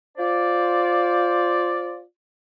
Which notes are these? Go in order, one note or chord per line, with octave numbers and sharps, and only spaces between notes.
F4 C5 D5